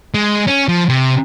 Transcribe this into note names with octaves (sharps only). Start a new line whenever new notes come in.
G#3
C#4
F3
C3